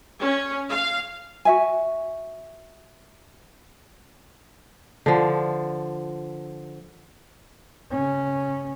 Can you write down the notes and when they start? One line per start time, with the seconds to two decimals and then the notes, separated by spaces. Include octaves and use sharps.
0.19 C#4
0.70 F5
1.45 F#4 E5 G#5
5.06 D3 F3
7.91 C#3 C#4